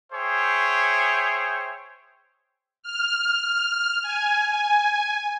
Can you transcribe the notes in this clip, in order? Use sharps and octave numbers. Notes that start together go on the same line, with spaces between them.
G#4 C5 C#5 E5 G5
F6
G#5